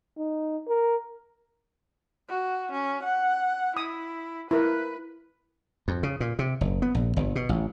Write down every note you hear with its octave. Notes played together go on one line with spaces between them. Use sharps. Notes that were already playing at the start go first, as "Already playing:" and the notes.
D#4
A#4
F#4
C#4
F#5
E4 D#6
E4 A#4 B4
F2
C#3
A#2
C3
F#1
B3
A#1
G1
B2
A1